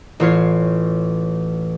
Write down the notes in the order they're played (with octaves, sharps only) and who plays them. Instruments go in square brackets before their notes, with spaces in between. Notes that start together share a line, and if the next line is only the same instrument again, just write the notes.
[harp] A1 F4 C#5 C7